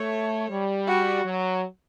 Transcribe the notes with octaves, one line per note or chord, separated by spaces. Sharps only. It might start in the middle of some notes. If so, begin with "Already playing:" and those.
Already playing: A3 C#5
G3
F#4
F#3